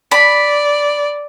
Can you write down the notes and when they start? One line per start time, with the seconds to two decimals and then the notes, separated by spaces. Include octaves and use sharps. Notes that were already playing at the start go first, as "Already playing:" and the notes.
0.11 D5 B5